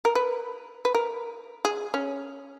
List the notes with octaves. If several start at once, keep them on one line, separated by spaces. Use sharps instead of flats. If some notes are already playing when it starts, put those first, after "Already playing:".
A#4
B4
B4
A#4
G#4
C#4